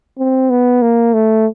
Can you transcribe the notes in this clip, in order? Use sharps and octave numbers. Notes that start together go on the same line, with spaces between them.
C4
B3
A#3
A3